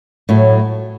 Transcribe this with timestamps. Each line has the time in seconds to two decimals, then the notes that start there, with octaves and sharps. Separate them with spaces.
0.29 A2 F#3 A3